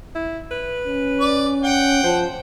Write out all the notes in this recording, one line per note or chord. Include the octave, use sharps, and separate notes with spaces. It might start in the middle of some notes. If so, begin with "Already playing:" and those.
E4
B4
C#4
D5
F#5 G5
F3 C5